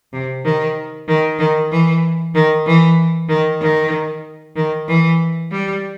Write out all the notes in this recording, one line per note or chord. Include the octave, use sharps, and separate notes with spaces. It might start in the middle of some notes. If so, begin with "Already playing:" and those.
C3
D#3
D#3
D#3
E3
D#3
E3
D#3
D#3
D#3
E3
G3